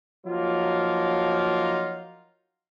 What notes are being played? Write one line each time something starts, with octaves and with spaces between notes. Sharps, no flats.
F3 F#3 A#3 D#4 F4